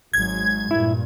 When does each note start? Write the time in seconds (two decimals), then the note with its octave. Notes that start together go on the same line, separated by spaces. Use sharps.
0.13 G#1 F#3 G#3 G#6
0.71 G2 A#2 E4